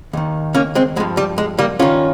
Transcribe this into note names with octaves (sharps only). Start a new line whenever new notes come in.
D#2 D#3
A#3 C#4
G#3 C4
G2 F3 G#3
G3
G#3
G3 A#3
G2 D#3 C#4 F4